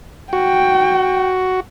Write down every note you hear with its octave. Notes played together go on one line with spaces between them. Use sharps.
F#4 G5